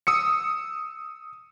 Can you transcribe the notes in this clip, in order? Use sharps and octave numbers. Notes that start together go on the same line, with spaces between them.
D#6 E6 C#7